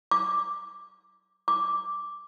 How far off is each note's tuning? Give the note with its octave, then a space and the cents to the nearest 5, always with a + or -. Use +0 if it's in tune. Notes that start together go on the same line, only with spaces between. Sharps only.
D6 +0
D6 -5